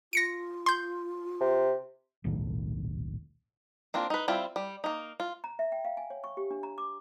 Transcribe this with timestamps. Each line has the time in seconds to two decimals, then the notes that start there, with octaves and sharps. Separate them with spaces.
0.13 F4 A#6 C#7 D7
0.66 C6 G6
1.41 C3
2.24 D#1 B1 A2 D#3
3.94 A#3 C4 D4 F4
4.10 D#4 B4
4.28 G3 C4 E4 F4
4.56 G3
4.84 A#3 D#4
5.20 F4
5.44 A#5
5.59 E5
5.72 G5
5.85 F5
5.97 G#5
6.10 C#5
6.24 C#6
6.37 G4
6.51 D4
6.63 A#5
6.78 D6